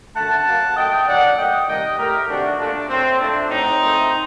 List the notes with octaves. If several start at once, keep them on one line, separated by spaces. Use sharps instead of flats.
F#2 D3 A3 F#5 A5
F#2 F#3 A#3
A#2 A3 D#5 G5
F#2 D#3 F#3 D5 F#5
A#2 A3 D#5 G5
C3 D#3 G3 A#3 D#5 G5
A2 A3 G4 A#4
C3 D#3 A3 D4 F#4
A#2 A3 D4
A#2 F#3 A3 C4
A#2 A3 D4
A2 F#3 A3 C4 D#4
A#2
A3